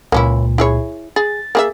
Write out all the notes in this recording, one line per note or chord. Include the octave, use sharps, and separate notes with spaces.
C#2 A#2 A#3 C#4 E4
E4 G#4 C#5
G#4 A6
A#3 G#4 E5